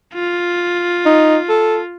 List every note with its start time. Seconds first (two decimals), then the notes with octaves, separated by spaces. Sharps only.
0.14 F4
1.06 D#4
1.49 A4